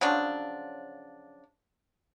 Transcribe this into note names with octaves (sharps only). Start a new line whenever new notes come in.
C#3 F3 F#3 D4